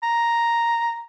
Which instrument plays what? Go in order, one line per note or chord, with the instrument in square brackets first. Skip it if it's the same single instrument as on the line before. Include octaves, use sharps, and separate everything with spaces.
[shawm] A#5